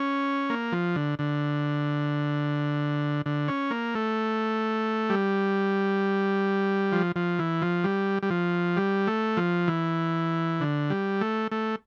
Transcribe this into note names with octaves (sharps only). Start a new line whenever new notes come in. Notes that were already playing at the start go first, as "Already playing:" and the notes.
Already playing: C#4
A#3
F3
D3
D3
D3
C#4
A#3
A3
G3
F3
F3
E3
F3
G3
G3
F3
G3
A3
F3
E3
D3
G3
A3
A3